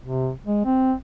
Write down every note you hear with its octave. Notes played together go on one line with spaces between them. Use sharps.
C3
G#3
C4